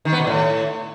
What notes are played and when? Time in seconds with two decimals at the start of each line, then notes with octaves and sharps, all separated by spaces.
0.05 D#3
0.12 B3
0.20 B2
0.27 A2